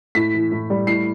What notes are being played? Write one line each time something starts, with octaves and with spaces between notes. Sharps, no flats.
A2 B6
E3
A2
G3
A2 C7